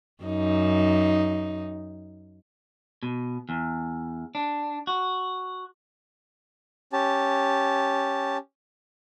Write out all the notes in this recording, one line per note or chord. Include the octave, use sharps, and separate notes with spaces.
F#2 D#4
B2
E2
D4
F#4
C#4 G4 A5